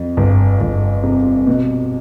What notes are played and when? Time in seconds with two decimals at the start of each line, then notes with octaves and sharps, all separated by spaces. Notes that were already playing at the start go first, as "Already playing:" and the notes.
Already playing: F2
0.17 G1
0.60 G1
1.03 C3
1.47 B2